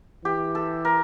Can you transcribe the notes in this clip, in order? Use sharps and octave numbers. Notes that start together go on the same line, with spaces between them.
E3 G4
A4
A#4